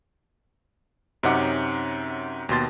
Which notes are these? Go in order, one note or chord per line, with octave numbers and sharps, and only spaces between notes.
F#2 C3 C#4 D#4 F#5 D6
D#2 B2 C6 A6